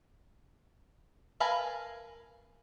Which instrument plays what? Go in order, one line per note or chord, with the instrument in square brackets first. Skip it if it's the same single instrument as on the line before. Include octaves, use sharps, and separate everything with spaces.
[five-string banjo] A#4 B4 F5 G#5 A5